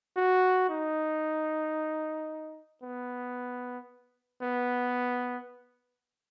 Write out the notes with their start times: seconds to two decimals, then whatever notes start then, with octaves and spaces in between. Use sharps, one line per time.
0.17 F#4
0.70 D#4
2.83 B3
4.42 B3